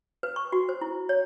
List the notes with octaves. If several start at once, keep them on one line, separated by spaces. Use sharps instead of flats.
B4
C#6
F#4
C5
E4
C#5